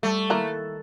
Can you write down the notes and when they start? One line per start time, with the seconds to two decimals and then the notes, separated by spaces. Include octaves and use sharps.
0.03 G3 A3 A5 C#6
0.30 D#3 A#3 E4 A#4 F#6